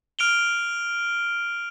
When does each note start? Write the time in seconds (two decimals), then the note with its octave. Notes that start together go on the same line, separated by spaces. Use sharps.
0.19 F6 D7 F7 G7